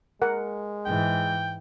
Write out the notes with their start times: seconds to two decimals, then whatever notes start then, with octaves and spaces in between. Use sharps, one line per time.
0.22 G#3 A#4 F#5
0.85 G#2 E3 G5